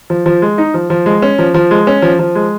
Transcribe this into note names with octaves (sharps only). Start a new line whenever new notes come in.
F3
F3
G#3
D#4
F3
F3
G#3
C#4
F3
F3
G#3
C#4
F3
F3
G#3